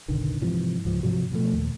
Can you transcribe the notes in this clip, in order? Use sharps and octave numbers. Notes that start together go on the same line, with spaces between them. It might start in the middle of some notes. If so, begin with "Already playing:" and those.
F#1 B1 D3 D#3
G#2 C3 E3 F3
C#2 G#2 F3
G#2 C3 F3 F#3
B2 F3 G3 A3
D#2 A#2